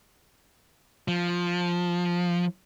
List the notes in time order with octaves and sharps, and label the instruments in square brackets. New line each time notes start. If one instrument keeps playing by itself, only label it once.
[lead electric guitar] F3